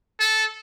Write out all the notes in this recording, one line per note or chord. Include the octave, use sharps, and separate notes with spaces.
A4